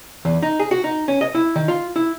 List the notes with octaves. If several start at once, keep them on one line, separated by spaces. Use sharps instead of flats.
E2
D#4
G#4
F#4
D#4
C#4
D#5
E4
D#3
F4
E4